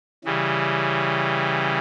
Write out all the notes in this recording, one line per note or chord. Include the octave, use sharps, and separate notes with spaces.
C#3 E3 G3